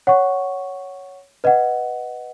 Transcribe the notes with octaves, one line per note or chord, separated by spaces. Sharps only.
C#5 F#5 C#6
B4 D#5 F#5